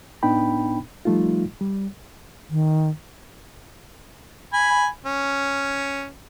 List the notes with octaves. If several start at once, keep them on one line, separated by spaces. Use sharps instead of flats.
A2 B3 D4 D#4 G5 B5
F3 G3 A3 D#4 F4
G3
D#3
G#5 B5
C#4